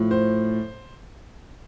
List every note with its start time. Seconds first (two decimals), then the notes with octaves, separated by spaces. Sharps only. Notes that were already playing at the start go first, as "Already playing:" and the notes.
Already playing: A2 F3
0.11 C5